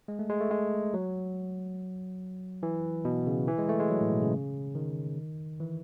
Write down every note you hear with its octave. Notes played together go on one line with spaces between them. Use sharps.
G#3
A3
G#3
A3
G#3
F#3
E3
B2
C#3
E3
G#3
A3
G#3
F#3
A2
B2
C#3
D#3
E3